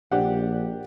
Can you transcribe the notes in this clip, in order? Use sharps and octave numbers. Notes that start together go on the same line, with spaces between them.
A#1 D4 G4 F#5